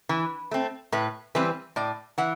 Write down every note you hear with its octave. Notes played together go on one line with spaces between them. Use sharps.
E3
A3 C4
A2 B4
E3 G3 C4 B4
A2 D5
E3 F#5